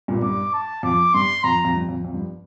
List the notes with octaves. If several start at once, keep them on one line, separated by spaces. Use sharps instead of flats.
G2 A#2
G2 D6
A5
F2 D6
G2 C6
F2 A#5
F2
G2
F2
F2
G2